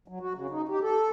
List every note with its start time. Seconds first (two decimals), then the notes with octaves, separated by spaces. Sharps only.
0.08 F#3
0.20 F#4
0.35 C#3
0.50 D#4
0.69 G4
0.82 A4